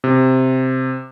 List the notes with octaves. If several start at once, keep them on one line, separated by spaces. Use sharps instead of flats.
C3